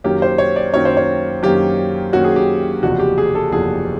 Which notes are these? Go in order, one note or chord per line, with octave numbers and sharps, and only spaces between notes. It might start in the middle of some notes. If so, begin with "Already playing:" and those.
F#2 D#3 F#3 A#3 C#4 G4
C5
C#5
D5
F#2 D#3 F#3 A#3 C#4 C#5
C5
C#5
F#2 D#3 F#3 A#3 C#4 G4
F#2 D#3 F#3 A#3 C#4 F#4
G#4
G4
F#1 E2 C3 F3 F#4
G4
G#4
A4
F#1 E2 C3 F3 G#4